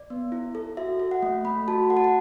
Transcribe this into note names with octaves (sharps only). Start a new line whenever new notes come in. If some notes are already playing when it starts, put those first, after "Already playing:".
Already playing: D5
B3
E4
A4
F#4 E5
A4
F#5
A3
A3 B5
F#4 A5
A4 F#5
A5
F#5